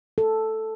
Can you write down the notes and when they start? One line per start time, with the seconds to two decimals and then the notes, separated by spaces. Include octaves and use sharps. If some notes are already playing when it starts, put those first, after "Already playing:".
0.18 A4